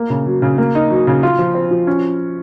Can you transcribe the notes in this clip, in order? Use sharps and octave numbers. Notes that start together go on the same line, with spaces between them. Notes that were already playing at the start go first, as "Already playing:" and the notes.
Already playing: A#3
C#3
F#3
C#3
A#3
D#4
F#3
C#3
F4
F3
C4
F3
C#4